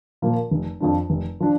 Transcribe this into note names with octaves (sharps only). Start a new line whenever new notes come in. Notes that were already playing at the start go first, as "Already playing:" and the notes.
A#2 F3 A#3
F1
F2 F3 D4
F1
F3 D4